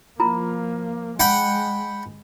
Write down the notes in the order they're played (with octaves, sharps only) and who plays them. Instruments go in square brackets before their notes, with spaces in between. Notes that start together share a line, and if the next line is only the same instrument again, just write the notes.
[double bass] F3 A#3 [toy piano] E4 F4 A#5
[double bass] G#3 [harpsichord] F#5 G5 B5